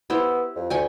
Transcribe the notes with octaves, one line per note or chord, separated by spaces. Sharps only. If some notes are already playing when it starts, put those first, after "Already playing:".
B3 E4 G4 C5
F2
D2 G5 G#5 C#6